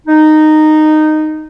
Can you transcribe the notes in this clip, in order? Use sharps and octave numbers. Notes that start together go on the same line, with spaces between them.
D#4